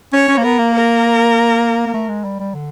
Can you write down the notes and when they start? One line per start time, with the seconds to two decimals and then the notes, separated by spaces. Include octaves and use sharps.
0.13 C#4 C#5
0.28 C#4
0.37 A#3
0.44 B3 A#4
0.59 A#3
0.74 A#4
1.86 A#3
1.94 A3
2.09 G#3
2.24 G3
2.40 G3
2.54 D3